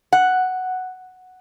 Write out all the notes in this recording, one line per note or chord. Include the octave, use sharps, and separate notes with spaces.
F#5